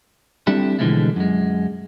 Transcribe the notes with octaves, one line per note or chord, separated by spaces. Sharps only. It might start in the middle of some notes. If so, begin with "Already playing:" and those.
G3 C4 D4 E4 G4 A4
B2 D3 E3 F3 G#3 A3
F#2 G#3